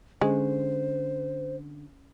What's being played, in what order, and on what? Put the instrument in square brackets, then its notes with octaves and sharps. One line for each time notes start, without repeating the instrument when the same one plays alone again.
[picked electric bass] D3 [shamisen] G#3 [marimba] C#4 [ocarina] C5